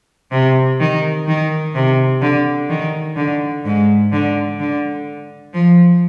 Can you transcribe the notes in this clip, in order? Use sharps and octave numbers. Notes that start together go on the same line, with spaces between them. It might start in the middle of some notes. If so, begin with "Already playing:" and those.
C3
D#3
D#3
C3
D3
D#3
D3
G#2
D3
D3
F3